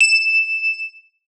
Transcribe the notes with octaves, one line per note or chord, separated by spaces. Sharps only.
E7